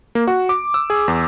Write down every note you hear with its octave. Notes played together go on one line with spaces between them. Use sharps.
A#3
F#4
D6
E6
G#4
E2